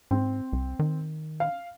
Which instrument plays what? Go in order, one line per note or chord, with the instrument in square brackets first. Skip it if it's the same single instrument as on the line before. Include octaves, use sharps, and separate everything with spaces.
[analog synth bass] G#2 [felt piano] C4
[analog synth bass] C2
D#3
[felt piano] F5